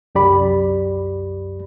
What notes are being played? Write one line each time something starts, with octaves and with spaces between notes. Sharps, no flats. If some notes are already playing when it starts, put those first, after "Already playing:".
C2 F#2 G4 D5 B5